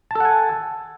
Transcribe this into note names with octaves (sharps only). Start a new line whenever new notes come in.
A4 F#5 G#5 A5